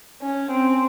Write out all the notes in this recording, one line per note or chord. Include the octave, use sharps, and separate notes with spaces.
C#4
C4